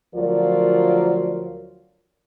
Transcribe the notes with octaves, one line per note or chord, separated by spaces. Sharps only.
D2 F3 F#3 F4 A#4 D5